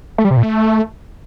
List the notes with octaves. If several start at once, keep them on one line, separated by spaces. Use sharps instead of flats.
A3
G3
C3
A#2
A3